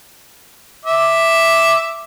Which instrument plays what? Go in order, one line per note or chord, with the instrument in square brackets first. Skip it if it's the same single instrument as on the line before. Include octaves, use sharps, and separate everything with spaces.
[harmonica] E5 D6